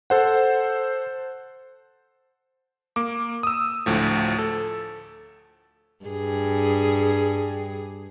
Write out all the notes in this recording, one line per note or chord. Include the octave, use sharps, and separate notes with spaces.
A4 C5 F#5
A#3 D6
D#6 E6
D2 A2 F3
A4
G2 G#4